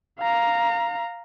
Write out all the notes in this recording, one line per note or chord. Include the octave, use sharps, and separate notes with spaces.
F5 A#5